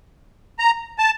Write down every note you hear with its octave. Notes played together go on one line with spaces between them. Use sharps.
A#5
A5